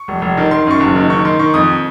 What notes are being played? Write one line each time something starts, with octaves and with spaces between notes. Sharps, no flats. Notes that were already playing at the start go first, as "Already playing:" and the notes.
Already playing: C#6
F1
F1
D#3
D#3 C6
F#2 C#6
F#1
D#3
D#3 C#6
D#3 C6
D#3 C#6
F2 D#6